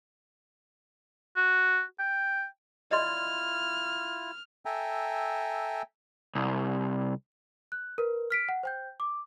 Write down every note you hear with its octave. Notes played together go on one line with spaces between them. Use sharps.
F#4
G5
E4 F4 D5 D#5 C6 F6
A4 E5 G5 G#5 A#5
C2
F#6
A#4 B4
F6 B6 D7
F#5
C5 G5 G6
D6